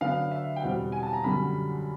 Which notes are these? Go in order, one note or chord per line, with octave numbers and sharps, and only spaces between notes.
D3 F#3 B3 D4 F5
E5
G5
E2 B2 G3 C4 F#5
G#5
A5
A#5
F#2 D3 G3 B5